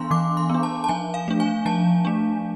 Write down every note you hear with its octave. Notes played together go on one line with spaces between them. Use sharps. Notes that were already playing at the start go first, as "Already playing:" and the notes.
Already playing: E3 B3 D4 F5 G#5 C6
E3 D6
C6
B3 D4
A5
A5
F3 G#5
F5
A3 D4
G#5
F3 A5
A3 D4